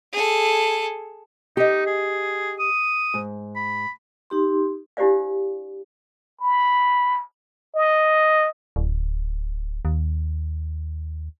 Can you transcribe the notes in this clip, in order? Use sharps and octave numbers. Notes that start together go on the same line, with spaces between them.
G#4 A4
D#4 G4 D#5
G#4
D#6
G#2
B5
D#4 G4 C6
D4 E4 G4 C5 D5 F5
B5
D#5
D1
D#2